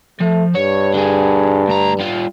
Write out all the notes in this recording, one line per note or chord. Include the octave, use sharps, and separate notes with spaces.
F3 A3
G2 C#5
D3 G#4
D2 A#5
G3 F4